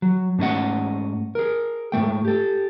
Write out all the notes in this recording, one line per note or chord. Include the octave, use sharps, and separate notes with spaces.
F#3
G#2 A3 C#4 D4 D#5 F#5
G#4 A#4
G#2 E3 A3 G5
G4 A4